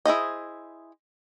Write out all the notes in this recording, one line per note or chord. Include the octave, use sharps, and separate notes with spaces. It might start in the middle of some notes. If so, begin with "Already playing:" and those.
E4 G#4 C5 D#5